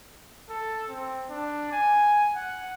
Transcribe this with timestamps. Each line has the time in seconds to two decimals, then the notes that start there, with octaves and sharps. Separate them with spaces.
0.49 A4
0.90 C4
1.30 D4
1.72 G#5
2.35 F#5